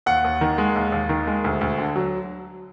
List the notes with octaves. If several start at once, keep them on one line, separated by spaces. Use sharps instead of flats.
D#2 F#5
D#2
D#3
G#3
D#2
D#2
D#3
G#3
D2
D2
D3
F#3